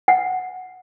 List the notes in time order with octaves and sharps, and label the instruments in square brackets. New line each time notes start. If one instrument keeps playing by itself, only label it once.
[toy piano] F#5